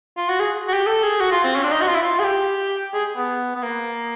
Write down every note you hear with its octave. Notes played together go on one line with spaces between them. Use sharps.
F4
F#4
G#4
F#4
G4
A4
G#4
F#4
F4
C4
C#4
D4
D#4
F#4
F4
E4
F4
G#4
G4
G#4
B3
B3
A#3